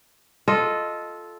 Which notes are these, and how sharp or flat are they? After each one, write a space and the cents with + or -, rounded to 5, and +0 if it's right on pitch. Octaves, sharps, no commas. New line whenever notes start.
F4 +0 A4 -10 D#5 +0